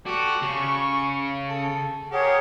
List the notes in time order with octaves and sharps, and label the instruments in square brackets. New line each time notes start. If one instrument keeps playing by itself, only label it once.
[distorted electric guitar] F#4 [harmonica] G4 A4 D5
[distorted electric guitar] C#3 [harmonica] C#6
[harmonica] A4
[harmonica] G4 A#4 [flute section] G#4 C#5 F#5